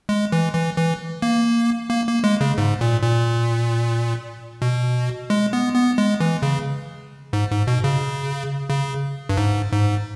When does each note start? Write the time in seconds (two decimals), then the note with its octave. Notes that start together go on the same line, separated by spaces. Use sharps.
0.09 G#3
0.32 E3
0.54 E3
0.77 E3
1.22 A#3
1.90 A#3
2.07 A#3
2.24 G#3
2.41 C#3
2.58 G#2
2.81 A#2
3.03 A#2
4.62 B2
5.30 G#3
5.53 B3
5.75 B3
5.98 G#3
6.20 E3
6.42 C#3
7.33 G#2
7.51 G#2
7.67 B2
7.84 C#3
8.70 C#3
9.29 G2
9.38 G#2
9.72 G#2